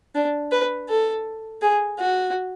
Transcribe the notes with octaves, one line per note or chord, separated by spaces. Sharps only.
D4
B4
A4
G#4
F#4